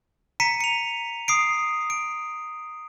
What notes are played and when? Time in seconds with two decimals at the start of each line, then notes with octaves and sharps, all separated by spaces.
0.40 A#5 B6 C#7 D#7
0.61 C#7 F7
1.28 D#6 C7 D7
1.90 D7